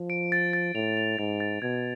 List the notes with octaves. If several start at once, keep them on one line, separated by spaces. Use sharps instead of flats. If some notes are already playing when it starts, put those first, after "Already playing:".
Already playing: F3
D7
A6
A6
A2 F7
F7
G#2 A6
A6
B2 G#6